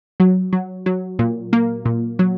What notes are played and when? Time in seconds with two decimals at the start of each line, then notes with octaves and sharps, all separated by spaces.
0.20 F#3
0.53 F#3
0.86 F#3
1.19 A#2
1.53 A#3
1.85 A#2
2.19 F#3